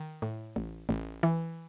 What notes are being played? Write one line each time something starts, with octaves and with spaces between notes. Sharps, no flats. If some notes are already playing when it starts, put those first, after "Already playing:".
Already playing: D#3
A2
A1
A1
E3